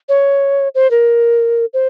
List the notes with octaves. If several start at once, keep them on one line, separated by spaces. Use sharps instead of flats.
C#5
C5
A#4
C5